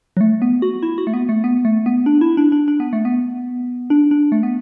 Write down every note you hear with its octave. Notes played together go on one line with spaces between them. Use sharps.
F#3
A3
B3
F#4
E4
F#4
A3
B3
A3
B3
A3
B3
D4
E4
D4
D4
D4
B3
A3
B3
D4
D4
A3
B3